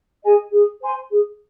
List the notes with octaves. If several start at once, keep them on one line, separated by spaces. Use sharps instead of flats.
G#4 D#5 G#5
G#4
C5 G#5 C6
G#4